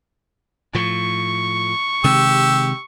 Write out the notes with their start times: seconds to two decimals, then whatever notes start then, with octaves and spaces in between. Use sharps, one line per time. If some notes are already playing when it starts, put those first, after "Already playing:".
0.75 A2 F3 C#6
2.04 C3 D#3 G#3 G4 E6